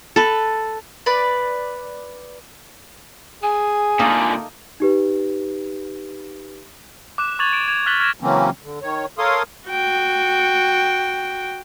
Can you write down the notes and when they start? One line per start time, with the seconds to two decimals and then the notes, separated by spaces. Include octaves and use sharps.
0.16 A4 B4
1.06 B4 D5
3.43 G#4 G#5
3.99 A#2 D3 A3 A#3 D#4
4.80 D#4 G4 B4
7.18 D6 F#6 E7
7.39 C#6 D6 G#6 A6 F7 F#7
7.53 D7
7.68 G#6 F7
7.86 F6 F#6 A6 B6 F#7 G7
8.00 F6 G#6 A#6 E7
8.20 C#3 E3 F#3 A#3 C4 C#4
8.63 D3
8.82 D#3 C#5
9.18 A4 A#4 C#5 F5 C6 D#6
9.68 F#4 G5